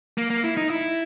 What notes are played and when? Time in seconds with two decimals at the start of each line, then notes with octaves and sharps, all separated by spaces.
0.18 A#3
0.30 A#3
0.44 E4
0.57 D#4
0.70 E4